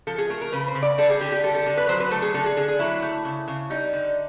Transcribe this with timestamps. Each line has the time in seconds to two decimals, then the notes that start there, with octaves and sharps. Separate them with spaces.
0.07 F3 A4
0.18 G#4
0.30 A3 A#4
0.42 A#4
0.52 C#3 B4
0.68 C5
0.75 C#3
0.83 D5
0.98 G3 A4
1.09 G#4
1.21 D3 G4
1.32 G4
1.43 G3 A4
1.55 A4
1.66 D3
1.77 B4
1.89 F#3 C5
2.00 B4
2.11 A3 A4
2.22 G#4
2.34 D3 A4
2.46 G#4
2.57 D3 G#4
2.68 G#4
2.79 F#3 E4
3.02 A3
3.25 C#3
3.48 C#3
3.70 G3 D#4
3.93 D3